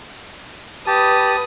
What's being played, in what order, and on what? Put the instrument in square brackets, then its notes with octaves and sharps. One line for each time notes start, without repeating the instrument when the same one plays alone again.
[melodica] G4 A5 [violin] B4 D#6